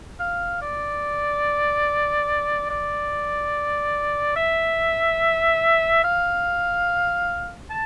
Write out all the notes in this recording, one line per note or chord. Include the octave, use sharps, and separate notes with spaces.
F5
D5
D5
E5
F5
A5